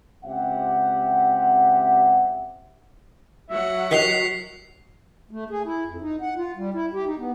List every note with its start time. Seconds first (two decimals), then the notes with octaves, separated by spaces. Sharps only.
0.25 C#2 C4 G4 E5 F#5
3.50 F#3 F#4 E5 F#5
3.91 D#3 D#4 G4 B6 C7 F7
5.31 A3
5.50 G#4
5.66 E4
5.86 F2
6.02 D#4
6.21 F#5
6.37 F4
6.56 G3
6.74 E4
6.94 G4
7.06 D#4
7.19 B3